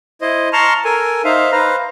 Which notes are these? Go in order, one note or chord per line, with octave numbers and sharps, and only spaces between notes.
E4 C5 D#5
A5 A#5 C6 C#6 F6
A4 A#4 G#5
D#4 C5 E5 F5
B4 C5 F5 A#5